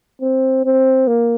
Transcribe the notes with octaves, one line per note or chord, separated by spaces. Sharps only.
C4
C4
A#3